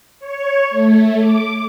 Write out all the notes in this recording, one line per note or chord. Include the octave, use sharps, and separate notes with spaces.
C#5
A3
D6